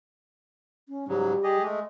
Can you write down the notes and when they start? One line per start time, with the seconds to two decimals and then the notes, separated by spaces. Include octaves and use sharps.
0.89 C#4
1.08 G#2 C#3 F#3 G3
1.43 G4 G#4 D#5
1.63 G#3 A3 D#5